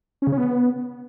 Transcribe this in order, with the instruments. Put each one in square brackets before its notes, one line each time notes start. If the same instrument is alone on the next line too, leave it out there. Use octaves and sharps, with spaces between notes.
[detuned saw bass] C#4
C#3
C#4
B3